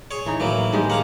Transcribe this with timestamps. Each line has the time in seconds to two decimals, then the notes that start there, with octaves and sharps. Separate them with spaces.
0.11 G#4 C#5
0.26 E3 D#4
0.40 A2 E3 F#3 A#3
0.72 D#3 G#3 G4
0.90 A#3 G#4 F5 F#5